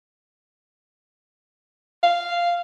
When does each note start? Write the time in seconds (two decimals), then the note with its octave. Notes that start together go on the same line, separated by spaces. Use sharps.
2.03 F5